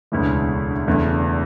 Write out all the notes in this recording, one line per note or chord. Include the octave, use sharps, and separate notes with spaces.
E1 D2 C#3 E3 G#3
E1 E2 C#3 E3 A3